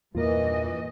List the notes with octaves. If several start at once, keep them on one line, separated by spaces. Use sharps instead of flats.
E2 G2 A#2 E3 A#3 F4 A#4 D#5